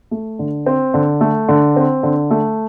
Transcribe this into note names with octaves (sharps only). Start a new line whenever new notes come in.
A3
D3
C4
D3
A3
D3
C4
D3
A3